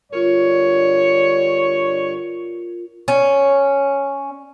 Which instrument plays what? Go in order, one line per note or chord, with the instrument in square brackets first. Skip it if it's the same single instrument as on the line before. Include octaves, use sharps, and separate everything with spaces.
[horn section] G2 D3 C#5 [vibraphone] F4 A#4
[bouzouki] C#4